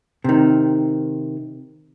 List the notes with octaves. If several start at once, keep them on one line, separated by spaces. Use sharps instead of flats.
C3 D#3